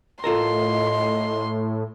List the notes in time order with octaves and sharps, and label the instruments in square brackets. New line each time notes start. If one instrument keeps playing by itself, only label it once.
[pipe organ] A2 [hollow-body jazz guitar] F4 A4 A#4 [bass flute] D#5 [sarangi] C6